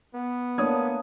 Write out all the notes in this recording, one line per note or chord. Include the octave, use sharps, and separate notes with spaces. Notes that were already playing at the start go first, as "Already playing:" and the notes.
B3
A3 A#3 D4 C#5 D#6 G#6